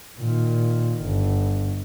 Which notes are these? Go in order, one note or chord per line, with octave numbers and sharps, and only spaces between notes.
A#2 D#3
G1